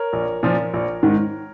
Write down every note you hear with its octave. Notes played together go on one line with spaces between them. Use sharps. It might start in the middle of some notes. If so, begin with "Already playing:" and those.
Already playing: A#4 C#5
A#1
A#2 F3
A#1
G#2 D#3